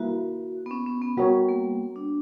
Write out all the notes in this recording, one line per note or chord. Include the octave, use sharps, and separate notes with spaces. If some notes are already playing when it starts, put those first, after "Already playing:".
Already playing: G3 A#3 E4 F#4 A#4
B3
C#4
C#4
B3
G3 B3 F#4 A#4 C#5
A#3
D4